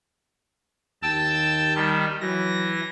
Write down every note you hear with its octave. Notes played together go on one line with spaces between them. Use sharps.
D#2 G5 A5 E6
D#3 G3
E3 F#3 A#6